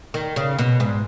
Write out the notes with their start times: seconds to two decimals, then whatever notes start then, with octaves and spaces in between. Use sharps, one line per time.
0.14 D#3
0.36 C#3
0.58 B2
0.80 G#2